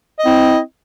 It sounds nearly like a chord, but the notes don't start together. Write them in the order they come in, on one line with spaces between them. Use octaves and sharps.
D#5 C4 E4